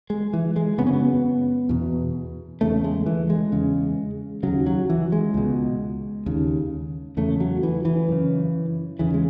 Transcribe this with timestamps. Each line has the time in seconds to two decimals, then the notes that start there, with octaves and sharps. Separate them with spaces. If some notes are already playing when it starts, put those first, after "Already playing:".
0.10 G#3
0.33 E3
0.56 G#3
0.78 C#3 B3
0.81 F#2
0.87 C#4
0.93 B3
1.69 E2 B2
2.61 E2 C#3 A3
2.84 G#3
3.06 E3
3.30 G#3
3.52 E2 C#3
4.43 D#2 C#3 F#3
4.66 F#3
4.90 E3
5.12 G#3
5.34 C#2 B2
6.26 D#2 C#3
7.17 E2 C#3 A3
7.40 F#3
7.63 E3
7.85 E3
8.08 F#2 C#3
8.99 E2 C#3 E3
9.14 G#3